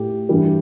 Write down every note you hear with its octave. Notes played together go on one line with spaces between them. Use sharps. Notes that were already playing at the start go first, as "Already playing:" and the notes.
Already playing: A2 A3 G4
G2 E3 G3